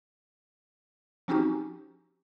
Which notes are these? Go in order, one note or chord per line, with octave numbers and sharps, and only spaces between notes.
F3 C4 C#4 D#4 F#4 G4